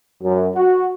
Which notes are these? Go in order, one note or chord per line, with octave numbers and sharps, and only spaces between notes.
F#2
F#4